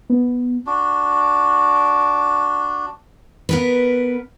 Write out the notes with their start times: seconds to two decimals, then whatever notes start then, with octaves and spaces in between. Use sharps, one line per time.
0.10 B3
0.66 D4 F#4
3.49 B3 A#4 B4